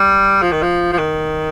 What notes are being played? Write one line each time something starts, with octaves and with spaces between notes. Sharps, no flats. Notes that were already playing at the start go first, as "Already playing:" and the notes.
Already playing: G3
F3
D#3
F3
F3
D#3